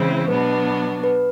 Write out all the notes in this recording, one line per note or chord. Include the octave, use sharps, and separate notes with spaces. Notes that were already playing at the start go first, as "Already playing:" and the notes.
Already playing: C#3 E3 G#3 C4 E4 C5
B2 F#3 B3 D4 B4
B4